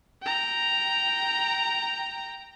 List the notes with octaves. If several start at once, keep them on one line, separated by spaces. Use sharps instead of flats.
G5 A#5